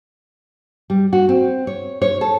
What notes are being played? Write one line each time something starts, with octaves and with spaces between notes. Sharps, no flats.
G3
F#4
C4
C#5
C#5
A4